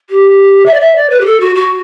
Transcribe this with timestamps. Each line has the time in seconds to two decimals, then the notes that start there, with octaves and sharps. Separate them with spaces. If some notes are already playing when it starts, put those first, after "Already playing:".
0.10 G4
0.65 E5
0.73 D5
0.80 E5
0.96 D5
1.10 B4
1.20 G4
1.26 A4
1.40 F#4
1.55 F#4